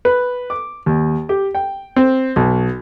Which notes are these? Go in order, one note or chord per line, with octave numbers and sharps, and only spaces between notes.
B4
D6
D#2
G4
G5
C4
B1